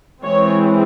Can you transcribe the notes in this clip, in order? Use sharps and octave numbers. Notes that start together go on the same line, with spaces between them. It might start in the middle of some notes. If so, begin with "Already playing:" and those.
E3 G#3 C4 C#5